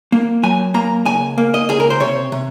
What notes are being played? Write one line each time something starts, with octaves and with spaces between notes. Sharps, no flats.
A#3
F#3 G#5
A#3 A#5
C#2 G#5
A#3
D#5
C#2 G#4
A#4
C5
C3 C#5
C3